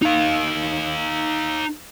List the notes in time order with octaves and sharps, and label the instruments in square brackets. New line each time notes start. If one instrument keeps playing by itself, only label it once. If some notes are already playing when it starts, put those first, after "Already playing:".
[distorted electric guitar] D#4 F5